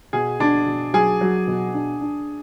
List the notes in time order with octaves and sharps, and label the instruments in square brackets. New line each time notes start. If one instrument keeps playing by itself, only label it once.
[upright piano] B2 [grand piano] G#4
[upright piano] B2 [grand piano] D4
[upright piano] B2
[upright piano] F#3 [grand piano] G#4
[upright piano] F#3
B2
D4
D4